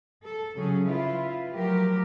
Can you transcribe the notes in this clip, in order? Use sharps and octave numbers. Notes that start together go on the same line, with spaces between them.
A4
C#3 F#3 C#4 G#4
E4 F4 B4
F3 F#3 A3 G4 A#4